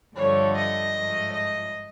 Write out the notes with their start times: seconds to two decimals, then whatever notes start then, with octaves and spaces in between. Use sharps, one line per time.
0.15 G2 D3 F3 A3 C#5
0.54 D#5
0.93 G#2 F3 A3
1.32 D#5